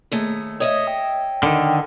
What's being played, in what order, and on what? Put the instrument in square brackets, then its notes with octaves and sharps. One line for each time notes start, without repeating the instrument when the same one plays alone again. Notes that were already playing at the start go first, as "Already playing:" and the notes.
[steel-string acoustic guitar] D#2 A3 G#4
[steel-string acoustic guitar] C#5 D#5 E5 [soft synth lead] D#6
[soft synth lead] G5
[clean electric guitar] D3 D#3